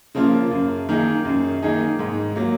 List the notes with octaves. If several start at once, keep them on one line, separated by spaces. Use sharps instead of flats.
C#3 F3 A#3 F4
F#2
D#3 A#3 D#4 G#4
F#2
D#3 A#3 D#4 G#4
G#2
F#3 A#3